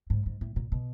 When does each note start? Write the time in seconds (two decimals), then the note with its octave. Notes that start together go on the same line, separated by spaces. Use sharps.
0.10 G#2
0.26 G#2
0.41 A2
0.56 A#2
0.72 B2